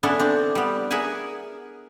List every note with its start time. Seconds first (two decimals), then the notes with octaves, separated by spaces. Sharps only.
0.03 B3 C#4 D4 E4 A4 B4
0.19 C4 D4
0.55 G3 B3
0.91 G#4 A#4 E5 F#5 G#5